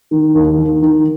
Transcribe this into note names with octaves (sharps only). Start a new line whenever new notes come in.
D#3
D#2
D#3
D#3